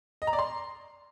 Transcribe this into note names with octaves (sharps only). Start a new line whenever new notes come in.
D#5
A#5
D5
C6